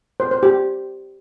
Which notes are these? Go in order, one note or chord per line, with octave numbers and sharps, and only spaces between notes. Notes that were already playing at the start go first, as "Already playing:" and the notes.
C5
C5
G4